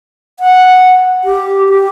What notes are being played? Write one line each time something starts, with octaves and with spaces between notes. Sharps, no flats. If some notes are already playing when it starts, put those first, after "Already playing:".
F#5
G4
G4